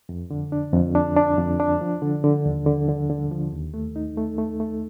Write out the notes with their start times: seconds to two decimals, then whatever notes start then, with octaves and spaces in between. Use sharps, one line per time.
0.09 F2
0.31 D3
0.52 D4
0.73 F2
0.95 D4
1.16 D4
1.38 F2
1.60 D4
1.81 F3
2.02 D3
2.24 D3
2.46 D#2
2.67 D3
2.89 D3
3.10 D3
3.31 F3
3.53 D#2
3.74 A3
3.96 D#4
4.17 A3
4.38 A3
4.60 A3